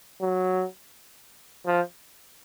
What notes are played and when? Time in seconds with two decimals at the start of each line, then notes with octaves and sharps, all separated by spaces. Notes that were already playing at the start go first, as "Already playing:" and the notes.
0.21 F#3
1.66 F3